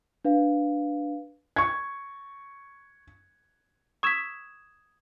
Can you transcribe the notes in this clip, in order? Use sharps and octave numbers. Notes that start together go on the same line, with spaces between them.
D4 B4 F5
C#6 G#6
C#6 D#6 E6 G#6 B6 E7